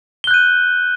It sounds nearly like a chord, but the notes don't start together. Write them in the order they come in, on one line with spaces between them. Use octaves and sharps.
G7 F#6 G6 D#7